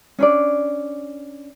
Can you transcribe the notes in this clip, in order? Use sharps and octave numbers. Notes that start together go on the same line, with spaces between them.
C#4 D4 D5